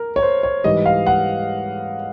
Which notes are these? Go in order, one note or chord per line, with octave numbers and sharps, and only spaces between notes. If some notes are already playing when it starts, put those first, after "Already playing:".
Already playing: A#4
C#5
C5
C#5
G#2 E3 G3 D#5
F5
F#5